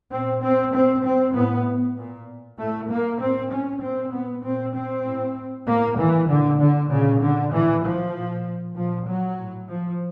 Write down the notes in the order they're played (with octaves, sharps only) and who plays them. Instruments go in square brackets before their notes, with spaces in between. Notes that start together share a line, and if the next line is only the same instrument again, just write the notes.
[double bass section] A#2 C4
C4
A#2 C4
C4
A2 B3
A#2
A2 A3
A#3
A2 C4
C#4
A#2 C4
B3
A#2 C4
C4
A2
A2 A#3
E3
A#2 D3
D3
A#2 C#3
D3
A2 E3
F3
A#2
A#2 F3
F#3
A2
F3